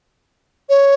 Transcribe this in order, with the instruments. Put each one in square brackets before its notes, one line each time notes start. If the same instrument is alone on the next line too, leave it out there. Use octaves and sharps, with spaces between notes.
[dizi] C#5